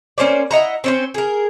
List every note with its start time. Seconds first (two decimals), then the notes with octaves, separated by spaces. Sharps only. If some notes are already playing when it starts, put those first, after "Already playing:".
0.18 A#3 C#4 C5 D5
0.51 E4 D#5 F#5 A#5
0.84 C4 C#4 C5
1.14 G#4 A#4